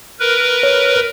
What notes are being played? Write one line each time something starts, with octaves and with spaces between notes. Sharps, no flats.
A#4 B4
C#5